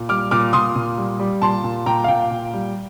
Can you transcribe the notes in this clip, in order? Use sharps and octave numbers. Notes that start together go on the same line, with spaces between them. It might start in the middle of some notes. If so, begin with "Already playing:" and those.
Already playing: A#2
G3 D6 F6
A#2 D6 F6
A#2 C6 D#6
A#2
G3
G3
A#2 A5 C6
A#2
A#2 G5 A#5
F5
A#2 G5
A#2
G3